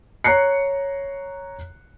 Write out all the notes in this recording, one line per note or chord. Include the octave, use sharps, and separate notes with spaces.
C#5 A#5 F#6 C7 C#7